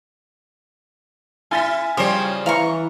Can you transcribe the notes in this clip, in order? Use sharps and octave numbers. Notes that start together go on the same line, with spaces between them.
E4 G#5 A6 B6
C#3 F3 G3 G4 C5 C#5 D#5
E3 F5 A#5 C#6